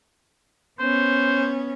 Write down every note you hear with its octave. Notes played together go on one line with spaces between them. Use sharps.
B3 C#4 C5